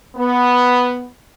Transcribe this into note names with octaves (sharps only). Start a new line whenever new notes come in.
B3